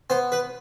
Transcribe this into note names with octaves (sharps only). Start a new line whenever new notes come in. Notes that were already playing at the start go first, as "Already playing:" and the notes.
B3 C5
B4